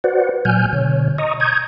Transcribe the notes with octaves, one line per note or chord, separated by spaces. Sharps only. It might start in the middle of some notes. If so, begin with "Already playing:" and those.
F#4 B4 C5 D5 F#5
A#2 F#3 G#5 F6 G6
B2 D3 C#5
D#5 A#5 C#6 D#6
A#5 C#6 D#6 G6 G#6